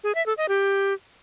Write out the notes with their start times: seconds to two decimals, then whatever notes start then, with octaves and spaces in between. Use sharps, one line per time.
0.04 G#4
0.15 E5
0.26 A4
0.37 D#5
0.49 G4